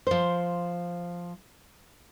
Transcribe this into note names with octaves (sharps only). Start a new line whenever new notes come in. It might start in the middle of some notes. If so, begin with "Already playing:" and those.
F3 C5